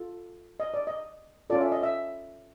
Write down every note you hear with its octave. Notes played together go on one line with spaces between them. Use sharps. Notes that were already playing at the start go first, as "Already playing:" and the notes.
Already playing: F4 A4
D#5
D5
D#5
C#4 F4 A4 D5
E5
D#5
E5